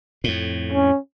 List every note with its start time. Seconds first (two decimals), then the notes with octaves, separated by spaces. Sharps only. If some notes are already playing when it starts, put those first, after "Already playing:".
0.24 F2 A2
0.72 C#4